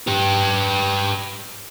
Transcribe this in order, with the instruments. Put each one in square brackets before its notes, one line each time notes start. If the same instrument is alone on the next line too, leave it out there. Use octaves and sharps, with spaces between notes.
[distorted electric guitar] G4 B4